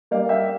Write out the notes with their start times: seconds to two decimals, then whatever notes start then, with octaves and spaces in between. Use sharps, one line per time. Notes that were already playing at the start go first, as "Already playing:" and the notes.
0.11 G3 A#3 D5 F5
0.29 E5 G5